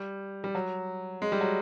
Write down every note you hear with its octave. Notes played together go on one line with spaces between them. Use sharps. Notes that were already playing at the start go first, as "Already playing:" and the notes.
Already playing: G3
G3
F#3
G#3
G3
F#3